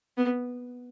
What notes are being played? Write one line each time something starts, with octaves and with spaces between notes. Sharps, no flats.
B3